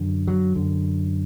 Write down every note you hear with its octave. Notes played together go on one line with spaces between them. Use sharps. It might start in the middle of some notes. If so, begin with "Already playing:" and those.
Already playing: F#2 D3
F#3
F#2 D3